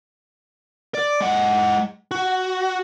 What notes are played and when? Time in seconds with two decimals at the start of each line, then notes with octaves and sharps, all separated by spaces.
0.94 D5
1.21 G#3 F#5
2.11 F#4